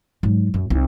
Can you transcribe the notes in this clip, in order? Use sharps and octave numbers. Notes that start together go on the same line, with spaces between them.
G#2 F#3
F#2
C2 D#4